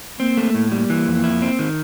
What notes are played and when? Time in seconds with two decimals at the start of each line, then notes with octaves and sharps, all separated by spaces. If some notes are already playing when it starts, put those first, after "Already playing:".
0.19 A#3 C4
0.37 A3
0.55 A2
0.71 G3 A#3
0.90 E3
1.07 F2
1.24 E4
1.42 C4
1.59 D#3